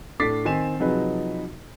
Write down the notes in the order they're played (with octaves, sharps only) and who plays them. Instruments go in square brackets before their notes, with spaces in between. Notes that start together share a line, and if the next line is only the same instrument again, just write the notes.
[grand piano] A2 D4 D6 A6 B6 C7
D#3 C4 G#5 E7
C3 F3 F#3 D#4 G#4 B4